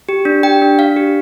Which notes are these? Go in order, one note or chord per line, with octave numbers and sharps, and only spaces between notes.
G4
D4
G4 G5
D4
D4 F5
G4